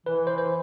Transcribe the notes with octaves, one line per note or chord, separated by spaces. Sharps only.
E3 B4
C5
C5